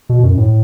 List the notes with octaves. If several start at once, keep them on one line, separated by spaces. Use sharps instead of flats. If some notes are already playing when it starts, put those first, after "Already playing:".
B2
F#2
A2